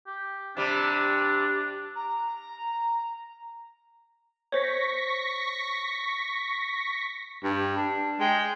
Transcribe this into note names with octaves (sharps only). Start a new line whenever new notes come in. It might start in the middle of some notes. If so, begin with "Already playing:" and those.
G4
C3 G3 D4
A#5
C5 C#5 C#6 A#6 B6
G2
D4
G#3 G5